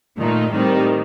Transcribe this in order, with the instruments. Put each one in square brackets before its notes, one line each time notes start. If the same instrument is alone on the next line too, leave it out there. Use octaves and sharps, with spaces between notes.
[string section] A#2 A3 D#4 [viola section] D#3
[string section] A2 G3 C4 D#4 [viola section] D#3